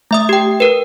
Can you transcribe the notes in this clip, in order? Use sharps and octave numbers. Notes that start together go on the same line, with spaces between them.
A3 E5 D#6
G4 G5
A#4 B4